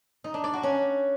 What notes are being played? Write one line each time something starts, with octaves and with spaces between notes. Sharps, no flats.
D#4
D4
D5
F#4
C#4